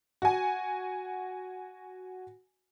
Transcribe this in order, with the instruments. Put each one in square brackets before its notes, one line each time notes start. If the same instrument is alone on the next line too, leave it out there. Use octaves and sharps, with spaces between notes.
[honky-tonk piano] F#4 G#5